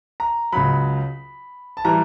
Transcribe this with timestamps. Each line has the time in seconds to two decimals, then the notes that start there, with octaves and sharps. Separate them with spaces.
0.20 A#5
0.52 C#2 C#3 F#3 B5
1.77 A5
1.85 E3 G3 A#5